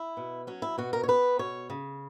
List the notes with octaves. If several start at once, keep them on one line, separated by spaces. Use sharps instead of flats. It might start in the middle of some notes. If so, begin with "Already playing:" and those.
Already playing: E4
B2
F#3 C#4
E4
B2 F#4
A#4
C#5
B3 B4
B2 C#5
C#3